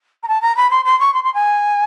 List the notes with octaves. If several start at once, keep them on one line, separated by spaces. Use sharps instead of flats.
A#5
A5
A#5
B5
C6
C6
C#6
C6
C6
G#5